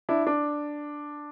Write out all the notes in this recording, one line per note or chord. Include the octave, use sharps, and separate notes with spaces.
D4 E4
D4